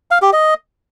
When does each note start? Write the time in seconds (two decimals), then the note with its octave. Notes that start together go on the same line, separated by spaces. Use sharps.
0.11 F5
0.22 G4
0.33 D#5